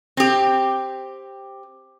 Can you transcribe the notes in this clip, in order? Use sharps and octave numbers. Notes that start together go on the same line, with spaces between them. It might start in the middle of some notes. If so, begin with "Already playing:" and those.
C4 G4